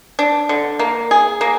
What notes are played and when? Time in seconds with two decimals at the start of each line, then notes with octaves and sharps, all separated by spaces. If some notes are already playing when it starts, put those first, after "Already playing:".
0.19 D4
0.49 D3
0.79 A#3
1.11 G#4
1.41 A#3